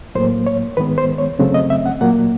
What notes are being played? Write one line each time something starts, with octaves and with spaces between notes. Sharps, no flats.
A2 F#3 A#3 C5
C#5
G#2 D#3 G#3 B3 B4
C5
C#5
F#2 C#3 F#3 A3 C4
D#5
E5
F#5
A#2 F#3 A#3 F#5